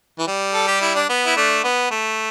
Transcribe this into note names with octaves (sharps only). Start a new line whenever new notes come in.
E3
G3
A4
G4
E4
D4
B3
E4
A3 D4
B3
A3